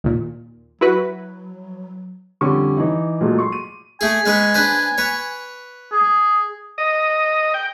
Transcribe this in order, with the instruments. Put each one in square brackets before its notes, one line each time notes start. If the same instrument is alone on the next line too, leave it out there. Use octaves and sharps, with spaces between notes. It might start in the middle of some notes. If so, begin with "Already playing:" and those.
[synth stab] D#2 A#2
[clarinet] F#3 [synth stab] E4 F#4 B4
[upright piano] F2 D3 G3 C#4 C#6 D6
E3 D#4
A#2 F#3 G#3 A3
C6 C#6
D#7
[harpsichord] A3 G#4 [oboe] G#5
[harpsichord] G#3 C#4 B4
D4 B4 C5
B4 C#5
[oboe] G#4
[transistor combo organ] D#5
G5